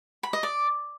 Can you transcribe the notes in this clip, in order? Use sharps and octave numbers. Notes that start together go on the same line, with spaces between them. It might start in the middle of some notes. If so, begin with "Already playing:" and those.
B5
D#5
D5